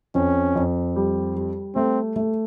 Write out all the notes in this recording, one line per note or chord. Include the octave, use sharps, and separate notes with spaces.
F2 C#4
F2
G3
G3
A3 C4
A3